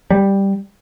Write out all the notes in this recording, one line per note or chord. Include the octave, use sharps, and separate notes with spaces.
G3